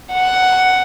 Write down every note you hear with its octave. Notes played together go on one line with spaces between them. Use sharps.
F#5